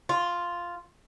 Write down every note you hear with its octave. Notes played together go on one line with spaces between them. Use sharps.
F4